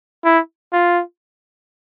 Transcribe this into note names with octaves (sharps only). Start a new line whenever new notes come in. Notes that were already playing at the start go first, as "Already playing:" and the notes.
E4
F4